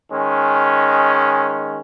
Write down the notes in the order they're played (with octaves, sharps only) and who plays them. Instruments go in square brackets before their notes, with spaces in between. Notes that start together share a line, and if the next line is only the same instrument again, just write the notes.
[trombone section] D#3 G#3 C#4